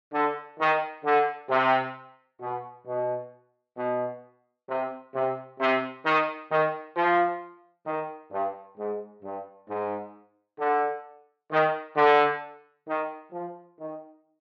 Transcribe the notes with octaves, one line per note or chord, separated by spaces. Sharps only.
D3
D#3
D3
C3
B2
B2
B2
C3
C3
C3
D#3
D#3
F3
D#3
G2
G#2
G2
G#2
D3
D#3
D3
D#3
F3
D#3